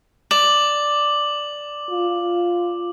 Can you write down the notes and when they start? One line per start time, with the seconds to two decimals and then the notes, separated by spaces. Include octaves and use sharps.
0.31 D5 D6 F#7
1.91 F4